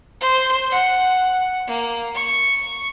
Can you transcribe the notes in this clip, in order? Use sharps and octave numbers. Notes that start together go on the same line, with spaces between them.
C5
F#5
A#3
C#6